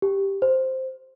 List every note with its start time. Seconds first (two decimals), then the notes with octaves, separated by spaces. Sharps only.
0.02 G4
0.42 C5